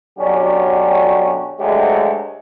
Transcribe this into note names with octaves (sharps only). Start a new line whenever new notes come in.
B2 D3 F#3 C#4 D4 G4
D2 F#3 G#3 A3 G4